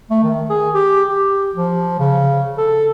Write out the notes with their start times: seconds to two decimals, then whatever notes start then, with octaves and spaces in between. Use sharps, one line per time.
0.10 A3
0.23 D#3
0.50 G#4
0.74 G4
1.09 G4
1.55 F3
2.00 C#3
2.58 A4